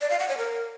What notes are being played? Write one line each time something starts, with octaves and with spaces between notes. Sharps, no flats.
D5
F5
F#5
C#5
A#4